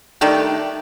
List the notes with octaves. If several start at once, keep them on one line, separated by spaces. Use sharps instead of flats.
D#3 G3 A3 D4